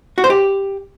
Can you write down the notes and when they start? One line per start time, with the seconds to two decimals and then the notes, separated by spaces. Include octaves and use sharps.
0.18 F#4
0.24 C5
0.30 G4